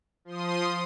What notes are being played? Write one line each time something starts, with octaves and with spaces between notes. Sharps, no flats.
F3 C6 D#6